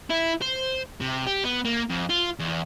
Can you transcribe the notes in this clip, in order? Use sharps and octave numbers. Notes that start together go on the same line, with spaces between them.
E4
C5
C3
G4
B3
A#3
F2
F4
E2